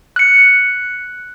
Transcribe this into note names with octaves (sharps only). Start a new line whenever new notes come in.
F#6 C#7